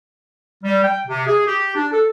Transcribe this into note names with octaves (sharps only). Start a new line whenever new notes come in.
G3
G5
C3
G#4
G4
D4
A4